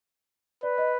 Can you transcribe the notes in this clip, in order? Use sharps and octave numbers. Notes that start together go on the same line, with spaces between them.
B4 D5
D#5